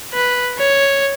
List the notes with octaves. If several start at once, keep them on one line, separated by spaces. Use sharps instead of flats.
B4
C#5